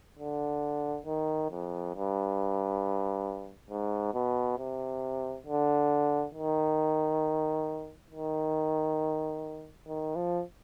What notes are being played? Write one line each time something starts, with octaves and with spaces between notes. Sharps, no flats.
D3
D#3
F2
G2
G#2
B2
C3
D3
D#3
D#3
D#3
F3